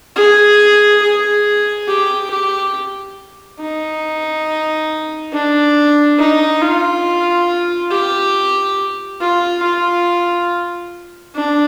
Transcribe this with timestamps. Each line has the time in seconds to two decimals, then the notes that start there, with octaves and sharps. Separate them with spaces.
0.16 G#4
1.02 G#4
1.87 G4
2.31 G4
3.60 D#4
5.33 D4
6.18 D#4
6.62 F4
7.91 G4
9.21 F4
9.63 F4
11.35 D4